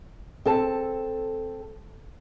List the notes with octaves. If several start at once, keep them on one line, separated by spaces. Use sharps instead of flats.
C4 A4 A5